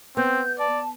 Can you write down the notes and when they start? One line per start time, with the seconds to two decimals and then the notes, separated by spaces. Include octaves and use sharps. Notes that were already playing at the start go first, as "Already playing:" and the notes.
0.17 B3 C4 G6
0.59 D5 A5